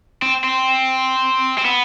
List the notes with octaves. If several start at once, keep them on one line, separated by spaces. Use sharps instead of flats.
C4
C4
C4
B3